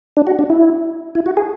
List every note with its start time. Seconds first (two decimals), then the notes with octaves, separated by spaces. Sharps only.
0.17 D4
0.27 F#4
0.39 D4
0.50 E4
1.15 E4
1.26 F#4
1.37 G#4